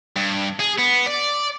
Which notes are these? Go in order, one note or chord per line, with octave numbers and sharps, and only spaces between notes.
G2
G#4
B3
D5